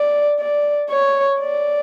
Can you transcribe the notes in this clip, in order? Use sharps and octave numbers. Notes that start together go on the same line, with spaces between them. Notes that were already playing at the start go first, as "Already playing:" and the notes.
Already playing: D5
D5
C#5
D5